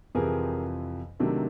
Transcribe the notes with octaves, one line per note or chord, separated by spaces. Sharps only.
F2 C3 E3 G#4 A#4
C3 D#3 F#3 A3 D4